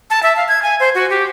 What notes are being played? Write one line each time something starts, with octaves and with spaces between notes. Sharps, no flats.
A5
E5
F5
G#6
G#5
C5
F#4
G4